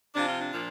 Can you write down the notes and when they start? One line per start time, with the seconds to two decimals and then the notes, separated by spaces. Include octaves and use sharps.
0.14 C3 F3 D4
0.27 F4
0.41 D4
0.52 A#2 F3